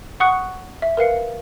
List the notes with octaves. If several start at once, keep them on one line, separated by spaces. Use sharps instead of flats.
F#5 C#6 D#6 F#6 C#7
E5
A#4 B4 F5 C#7